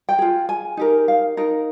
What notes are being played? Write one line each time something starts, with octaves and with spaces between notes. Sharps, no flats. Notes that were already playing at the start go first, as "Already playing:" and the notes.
G5
F4 G#4
G#5
D#4 G4 A#4
F5
D#4 A#4